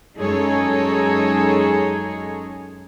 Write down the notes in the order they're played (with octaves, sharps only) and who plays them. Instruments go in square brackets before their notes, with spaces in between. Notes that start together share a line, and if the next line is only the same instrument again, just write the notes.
[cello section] F#2 G#3 D#4 G#4 A4 C#5